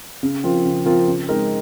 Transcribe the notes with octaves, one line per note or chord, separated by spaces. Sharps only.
C#3
F3 C4 F4 A#4
C#3
F3 C4 F4 A#4
C#3
G#3 C4 D#4 A#4